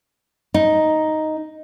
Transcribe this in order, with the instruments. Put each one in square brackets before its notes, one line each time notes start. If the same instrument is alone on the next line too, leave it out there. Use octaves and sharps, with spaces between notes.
[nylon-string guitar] D#4